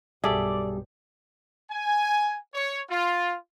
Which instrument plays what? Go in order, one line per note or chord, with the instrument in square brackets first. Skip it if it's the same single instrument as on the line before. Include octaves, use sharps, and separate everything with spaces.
[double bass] B1 G2 [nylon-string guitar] G3 [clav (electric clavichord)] G#4 A4 E5 [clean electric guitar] D5
[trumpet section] G#5
C#5
F4